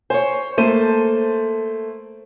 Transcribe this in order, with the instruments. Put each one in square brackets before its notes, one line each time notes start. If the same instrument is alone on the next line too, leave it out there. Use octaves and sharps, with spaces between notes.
[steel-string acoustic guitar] C5 C#5 [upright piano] G#5
[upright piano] A3 A#3 D#7 [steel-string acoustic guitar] A4 C5